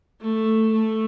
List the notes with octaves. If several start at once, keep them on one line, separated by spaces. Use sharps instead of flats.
A3
A3